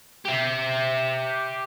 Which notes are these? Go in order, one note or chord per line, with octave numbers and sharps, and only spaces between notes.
G4 E5